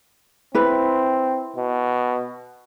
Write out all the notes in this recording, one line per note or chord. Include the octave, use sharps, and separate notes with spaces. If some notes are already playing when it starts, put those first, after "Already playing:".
C4 E4 B4
B2